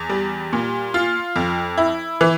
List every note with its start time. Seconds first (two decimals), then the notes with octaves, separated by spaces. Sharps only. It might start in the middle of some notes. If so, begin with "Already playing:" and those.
Already playing: E2
0.09 G3
0.53 A#2
0.94 F4
1.36 F2
1.78 E4
2.21 E3